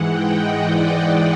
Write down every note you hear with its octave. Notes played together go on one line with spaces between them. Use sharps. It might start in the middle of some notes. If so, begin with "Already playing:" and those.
Already playing: G#2 E3 G#3 F#5
G5
D#5
D5
D#5